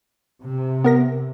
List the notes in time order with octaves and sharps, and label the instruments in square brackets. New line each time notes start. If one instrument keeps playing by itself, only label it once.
[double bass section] C3
[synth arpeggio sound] B3 A#4 A#6